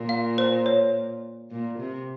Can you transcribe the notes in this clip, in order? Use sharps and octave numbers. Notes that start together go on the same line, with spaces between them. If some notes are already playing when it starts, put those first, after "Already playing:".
Already playing: A#2
F5
C5
C#5
A#2
C3